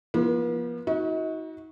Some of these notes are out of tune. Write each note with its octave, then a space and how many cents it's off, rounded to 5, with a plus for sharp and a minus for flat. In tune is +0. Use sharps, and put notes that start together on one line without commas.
F3 -20 B3 -45
D#4 +40 F#4 -10